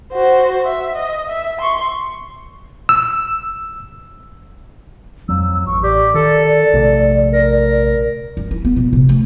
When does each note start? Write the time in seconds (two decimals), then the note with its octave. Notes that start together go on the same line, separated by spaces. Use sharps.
0.13 F#4 C5
0.65 E5
0.95 D#5
1.29 E5
1.61 C6 C#6
2.89 E6
5.29 F2 F#3 E6
5.66 A1 C#6
5.83 G4 D5
6.14 D#3 A4
6.73 A#1 C3 A3
7.33 A#4
8.37 F#2
8.51 E4
8.65 B3
8.76 A#2
8.93 C3
9.09 D2